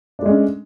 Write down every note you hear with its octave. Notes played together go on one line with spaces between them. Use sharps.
G#3 A3 C#4 D4